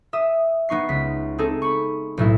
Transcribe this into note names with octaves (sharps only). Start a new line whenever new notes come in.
E5 D#6
B3 D#4 C#6 C7
C#2 B6
C4 D#4 G#4 A4
B5 C#6
B1 A2 E4